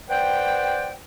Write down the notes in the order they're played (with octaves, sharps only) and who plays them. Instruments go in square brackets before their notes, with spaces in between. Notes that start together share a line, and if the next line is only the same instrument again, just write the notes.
[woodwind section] B4 C5 D5 F#5 G5